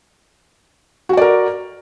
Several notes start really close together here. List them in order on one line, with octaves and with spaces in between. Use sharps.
F#4 F#5 D5 A#4